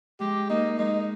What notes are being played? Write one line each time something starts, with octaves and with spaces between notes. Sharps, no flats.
G#3 G4
A#3 D#4
G#3 D#4